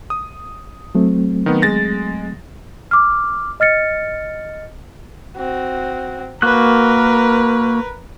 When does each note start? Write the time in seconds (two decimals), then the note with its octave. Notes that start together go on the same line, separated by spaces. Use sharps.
0.10 D#6
0.95 F#3 A3 C4
1.46 D#3 B3
1.62 G#3 A6 A#6
2.91 D6 F6
3.60 D#5 F6 A6 C#7
5.37 C4 F#4
6.42 A#3 F#4 A#4 B4 F#6